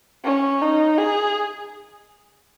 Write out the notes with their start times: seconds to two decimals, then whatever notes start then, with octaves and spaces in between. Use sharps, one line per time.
0.24 C#4
0.62 D#4
0.98 G#4